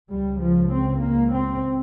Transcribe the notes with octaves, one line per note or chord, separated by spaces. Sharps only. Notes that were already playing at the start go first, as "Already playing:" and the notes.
C#2 C#3 G3
F3
C4
A#3
C4